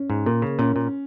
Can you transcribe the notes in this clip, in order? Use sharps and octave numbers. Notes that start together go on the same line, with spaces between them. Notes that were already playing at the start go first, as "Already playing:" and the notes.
Already playing: C#4
G#2
A#2 A#3
C#3
A#2 C#4
A#2